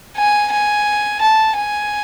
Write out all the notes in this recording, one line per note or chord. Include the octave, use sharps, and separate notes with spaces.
G#5
G#5
A5
G#5